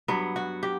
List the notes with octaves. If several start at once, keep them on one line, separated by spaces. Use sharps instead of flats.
G2 F#3 B3
F#4
G4